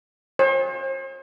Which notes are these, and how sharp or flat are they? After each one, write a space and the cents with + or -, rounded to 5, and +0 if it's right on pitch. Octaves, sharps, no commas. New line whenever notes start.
C5 +45